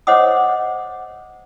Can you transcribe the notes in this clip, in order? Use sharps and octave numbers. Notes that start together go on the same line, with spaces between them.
C5 C#5 D#5 F#5 D6 D#6